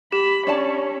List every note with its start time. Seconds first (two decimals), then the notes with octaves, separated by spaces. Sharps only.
0.12 G4 B5
0.47 C#4 D4 C#5 D5 A5